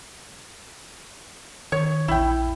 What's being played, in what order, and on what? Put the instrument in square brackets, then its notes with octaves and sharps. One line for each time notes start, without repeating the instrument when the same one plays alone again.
[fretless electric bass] D#3 [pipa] C#5
[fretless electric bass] A#1 E2 [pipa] E4 G5